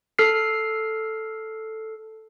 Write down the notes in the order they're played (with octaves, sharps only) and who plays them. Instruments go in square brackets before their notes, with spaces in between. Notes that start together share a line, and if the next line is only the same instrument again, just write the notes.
[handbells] A4 F6 C7